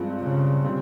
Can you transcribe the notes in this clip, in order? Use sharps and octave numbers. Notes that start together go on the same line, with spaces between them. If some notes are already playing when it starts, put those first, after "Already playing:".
Already playing: G2 F3 G#3 C4 F4
C#3
G3 C4